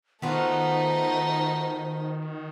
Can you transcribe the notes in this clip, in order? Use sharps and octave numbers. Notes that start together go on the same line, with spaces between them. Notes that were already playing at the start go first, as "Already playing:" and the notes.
D#3 A3 B3 D#4 F4 F#4 C5